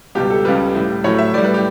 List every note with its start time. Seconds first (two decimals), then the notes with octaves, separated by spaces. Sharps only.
0.15 C#2 B2 G3 G4
0.30 A4
0.45 C#2 C#3 G3 B4
0.75 A2 G3
1.04 A2 F#3 A3 C#5
1.18 E5
1.34 A2 D5
1.38 G3
1.44 B4
1.54 G4